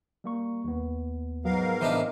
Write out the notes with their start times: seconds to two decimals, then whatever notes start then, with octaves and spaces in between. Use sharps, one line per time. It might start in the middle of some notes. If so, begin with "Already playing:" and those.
0.24 G3 A#3 C#6
0.64 D#2 B3
1.45 G#2 F#3 B3 A#4 F5
1.81 A2 C3 E3 B3 D4 C5 D#5 E5